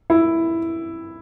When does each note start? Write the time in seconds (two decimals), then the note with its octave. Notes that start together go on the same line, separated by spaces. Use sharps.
0.10 E4